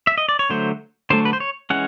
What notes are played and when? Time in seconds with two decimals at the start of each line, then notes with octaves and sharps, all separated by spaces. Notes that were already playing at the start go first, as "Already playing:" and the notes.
0.07 E5
0.18 D#5
0.29 D5
0.39 C#5
0.50 D3 F#3 A3 C5
1.10 D3 F#3 A3 C5
1.25 B4
1.33 C5
1.40 C#5
1.70 E3 G#3 C#4 F#5